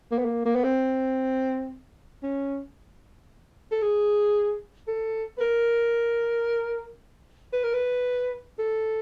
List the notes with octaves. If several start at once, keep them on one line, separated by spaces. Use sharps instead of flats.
A#3
B3
A#3
A#3
B3
C4
C#4
A4
G#4
A4
B4
A#4
B4
A#4
B4
A4